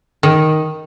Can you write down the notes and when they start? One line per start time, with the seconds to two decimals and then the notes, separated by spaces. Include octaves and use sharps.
0.23 D#3